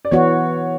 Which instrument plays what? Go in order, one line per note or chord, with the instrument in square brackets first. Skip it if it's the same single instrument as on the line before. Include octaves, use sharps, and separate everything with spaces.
[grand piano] D5
[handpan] E3 B3 F#4 [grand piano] C#5